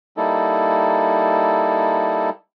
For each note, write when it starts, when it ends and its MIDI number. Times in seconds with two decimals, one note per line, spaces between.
0.17 2.30 55
0.17 2.30 58
0.17 2.30 63
0.17 2.30 64
0.17 2.30 69